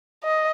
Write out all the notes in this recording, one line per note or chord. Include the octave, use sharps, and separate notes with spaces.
D#5